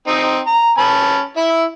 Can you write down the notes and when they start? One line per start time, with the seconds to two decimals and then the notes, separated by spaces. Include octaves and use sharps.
0.07 C4 D#4
0.47 A#5
0.78 C#4 A5 B5
1.37 E4 E5